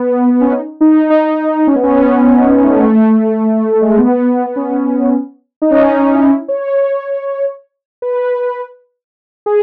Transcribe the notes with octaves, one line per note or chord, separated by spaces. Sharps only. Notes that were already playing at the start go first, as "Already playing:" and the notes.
Already playing: B3
B3
C#4
D#4
D#4
D#4
C#4
B3
C#4
B3
D#4
B3
A3
A3
G#3
A3
B3
B3
C#4
D#4
C#4
D#4
D#4
E4
E4
C#5
C#5
B4
G#4